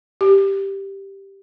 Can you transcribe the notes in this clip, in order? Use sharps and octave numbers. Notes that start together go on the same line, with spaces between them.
G4